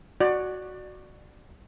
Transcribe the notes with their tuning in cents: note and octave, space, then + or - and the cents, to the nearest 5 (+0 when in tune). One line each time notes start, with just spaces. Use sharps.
F#4 +0 D5 +25